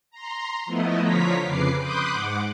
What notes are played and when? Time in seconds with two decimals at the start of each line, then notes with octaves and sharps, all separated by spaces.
0.11 A#5 C6
0.66 F3 A3 B3 E4 D#5
1.01 D3 F3 F4 C#5 A#5 B6
1.43 F2 C#3 B4 D6 C7
1.79 B5 C6 D6 D#6 F#6 G6
2.13 G#2 F#5 D6